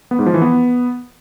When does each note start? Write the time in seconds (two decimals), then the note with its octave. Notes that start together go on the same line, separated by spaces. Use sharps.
0.11 B3
0.19 G#2
0.26 F3
0.34 E3
0.42 B3